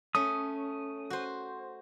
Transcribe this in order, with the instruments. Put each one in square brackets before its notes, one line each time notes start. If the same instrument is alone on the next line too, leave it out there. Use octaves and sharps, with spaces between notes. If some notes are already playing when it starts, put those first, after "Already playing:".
[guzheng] A3 C#4 [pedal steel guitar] D#6
[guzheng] F#4 C5